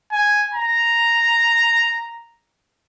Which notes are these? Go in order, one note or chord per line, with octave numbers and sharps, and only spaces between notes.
G#5
A#5